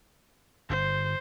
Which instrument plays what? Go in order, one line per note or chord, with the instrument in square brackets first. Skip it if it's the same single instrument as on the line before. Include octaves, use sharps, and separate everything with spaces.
[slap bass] G1 [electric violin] C5